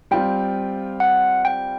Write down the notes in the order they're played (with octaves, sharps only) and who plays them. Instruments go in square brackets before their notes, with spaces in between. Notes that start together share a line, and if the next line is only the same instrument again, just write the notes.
[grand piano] G3 C4 F4 [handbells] G5
[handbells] F#5
G5